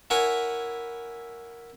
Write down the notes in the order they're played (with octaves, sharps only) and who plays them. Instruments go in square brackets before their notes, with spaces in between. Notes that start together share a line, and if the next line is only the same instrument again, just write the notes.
[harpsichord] E4 A#4 C#5 F#5 G#5 B5